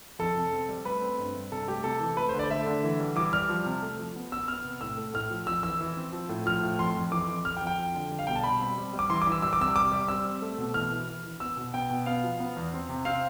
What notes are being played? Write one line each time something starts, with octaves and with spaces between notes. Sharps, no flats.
F2 A4
C3
C4
G3
A3 B4
C4
G2
G2
C3 A4
A3 G4
C3 A4
E3
A3 B4
C5
D3
D5
A3 E5
D3
E3
G3
E3 D6
G3 F6
F3
C3
A3
F3
B3
B3 E6
B3 F6
C3
A2 E6
A3
A2 F6
F3
F2 E6
E3 E6
E3
C4
F3
A2
F3 F6
A2
F2 C6
F2
E3 D6
F2
F2 F6
G5
F2
G5
F3
D3
G3
F5
B2 G5
A5
G3 B5
C4
G3
G3
D6
E3 C6
D6
E3 E6
G3 E6
D6
C3 E6
G3 D6
G3
C4 E6
C4
A3
B2
E3 F6
E3
E3
E3
B3 E6
B2
B3 G5
B2
B3 F5
F3
B3
E2
C4
C3
C4 F5